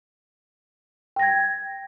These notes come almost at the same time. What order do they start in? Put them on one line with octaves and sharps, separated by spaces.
G5 A#6 G#6